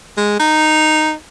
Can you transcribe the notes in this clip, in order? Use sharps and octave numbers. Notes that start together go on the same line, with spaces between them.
G#3
D#4